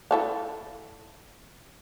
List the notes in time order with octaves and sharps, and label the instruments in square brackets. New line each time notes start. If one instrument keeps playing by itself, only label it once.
[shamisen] E4 A4 F5